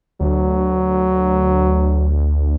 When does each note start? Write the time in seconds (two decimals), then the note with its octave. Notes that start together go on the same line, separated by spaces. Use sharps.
0.21 D2 F#3